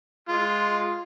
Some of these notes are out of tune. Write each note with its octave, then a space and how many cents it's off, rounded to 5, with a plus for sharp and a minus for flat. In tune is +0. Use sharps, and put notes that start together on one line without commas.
G#3 +0 F4 +0